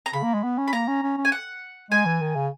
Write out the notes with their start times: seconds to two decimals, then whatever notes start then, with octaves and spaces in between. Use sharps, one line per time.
0.06 A#5
0.13 C#3 B5
0.23 A#3
0.34 G#3
0.43 B3
0.58 C#4
0.68 B5
0.73 A#3 A#5
0.88 C#4
1.03 C#4
1.17 C#4
1.25 G#5
1.32 F#5
1.91 G#3 G#5
2.06 E3
2.21 D#3
2.35 C#3